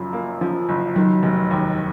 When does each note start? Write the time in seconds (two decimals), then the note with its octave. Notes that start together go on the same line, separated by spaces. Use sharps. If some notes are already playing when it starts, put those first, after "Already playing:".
Already playing: F#1 F#2 F3
0.13 A#3
0.41 F3
0.69 F#1
0.96 D#3 F#3
1.23 F1
1.51 D#2